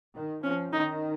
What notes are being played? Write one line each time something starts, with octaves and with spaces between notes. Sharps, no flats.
D#3
F3 C#4
D#3 D#4